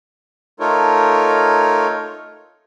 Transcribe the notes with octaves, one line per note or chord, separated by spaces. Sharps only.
A3 D#4 F4 A4 A#4 C#5